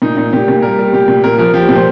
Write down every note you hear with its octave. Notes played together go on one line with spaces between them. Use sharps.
A#2 D#4
A#2 D#4
A#2 G4
A#2
G3 A#4
G3
A#2 G4
A#2
A#2 A#4
F3 A#4
F3 G4
A#2
C5